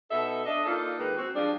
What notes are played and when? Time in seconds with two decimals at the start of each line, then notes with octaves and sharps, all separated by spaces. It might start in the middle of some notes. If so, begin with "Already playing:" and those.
0.11 B2 D#4 A4 E5
0.46 D4 D#5
0.65 A#3 D4 D#4 F4 A4
0.99 D#3 G#3 A#3 B4
1.17 C4 F#4
1.35 F3 G3 G#3 D4